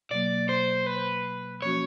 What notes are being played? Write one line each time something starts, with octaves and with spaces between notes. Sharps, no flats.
B2 F#3 A#3 D5
C5
B4
F3 A#3 C#4 F#4 C#5